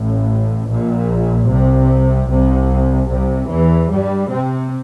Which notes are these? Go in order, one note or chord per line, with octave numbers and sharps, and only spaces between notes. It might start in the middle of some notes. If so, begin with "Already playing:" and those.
Already playing: A1 A2
A#1 A#2
C2 C3
C2 C3
C2 C3
E2 E3
G2 G3
C3 C4